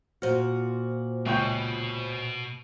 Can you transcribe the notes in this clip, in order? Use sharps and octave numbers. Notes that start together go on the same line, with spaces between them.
A#2 F4 F#4 C5 F6
C#2 B2 C#5 G5